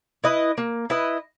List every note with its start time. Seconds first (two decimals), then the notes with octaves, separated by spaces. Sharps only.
0.24 E4 B4 D#5
0.58 A#3
0.90 E4 B4 D#5